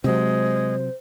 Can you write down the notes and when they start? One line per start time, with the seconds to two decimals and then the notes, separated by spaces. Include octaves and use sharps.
0.04 C3 F#3 G#3 C5